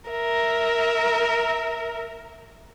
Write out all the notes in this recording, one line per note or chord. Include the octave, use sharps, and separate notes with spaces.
A#4 E5